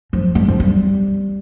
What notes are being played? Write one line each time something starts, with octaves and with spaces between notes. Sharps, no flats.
F3
G3
F3
G3